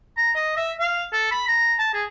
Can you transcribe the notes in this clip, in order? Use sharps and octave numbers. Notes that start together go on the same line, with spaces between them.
A#5
D#5
E5
F5
A4
B5
A#5
A5
G#4